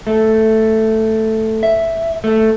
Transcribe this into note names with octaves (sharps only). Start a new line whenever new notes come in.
A3
E5
A3